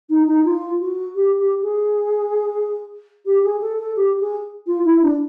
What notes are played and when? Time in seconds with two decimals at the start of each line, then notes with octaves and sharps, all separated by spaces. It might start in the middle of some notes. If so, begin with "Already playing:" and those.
0.10 D#4
0.27 D#4
0.45 F4
0.80 F#4
1.15 G4
1.38 G4
1.62 G#4
3.25 G4
3.43 G#4
3.61 A4
3.79 A4
3.96 G4
4.20 G#4
4.67 F4
4.84 E4
5.02 D4